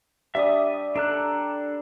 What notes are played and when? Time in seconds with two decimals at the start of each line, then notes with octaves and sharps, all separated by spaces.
0.35 G3 D4 E5 D#6
0.96 D4 A4 A#4 F#6